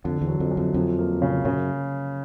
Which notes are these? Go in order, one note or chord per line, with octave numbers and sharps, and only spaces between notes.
F2 D3
E2
F#3
F2
F#2
F2
F2 F3
A#3
C#3
F#2 C#3